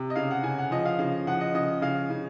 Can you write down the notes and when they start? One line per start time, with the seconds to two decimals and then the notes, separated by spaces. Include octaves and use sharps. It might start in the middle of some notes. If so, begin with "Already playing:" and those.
Already playing: C3
0.10 D#5
0.16 C#3 F5
0.31 F#5
0.43 C#3 G#5
0.58 F#5
0.71 F3 D#5
0.85 F5
0.99 C#3 F5
1.27 F3 F#5
1.40 D#5
1.54 C#3 D#5
1.82 C#3 F5
2.10 C#3